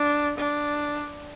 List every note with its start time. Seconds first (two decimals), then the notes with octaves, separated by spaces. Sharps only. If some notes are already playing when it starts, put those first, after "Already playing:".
Already playing: D4
0.38 D4